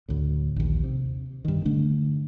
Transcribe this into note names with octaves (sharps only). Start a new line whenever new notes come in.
D2 A2
A#1 D#2
C3
G2 D#3
D3 A3 D4